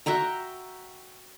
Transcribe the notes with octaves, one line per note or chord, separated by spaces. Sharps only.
F#4 E5 G5 A#5